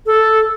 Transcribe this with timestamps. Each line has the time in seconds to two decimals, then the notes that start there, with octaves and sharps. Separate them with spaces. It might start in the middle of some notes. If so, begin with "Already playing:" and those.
0.06 A4